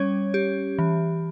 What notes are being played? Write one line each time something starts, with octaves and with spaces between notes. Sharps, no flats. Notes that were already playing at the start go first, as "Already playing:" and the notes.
Already playing: G3 C#4 C#5
G4
E3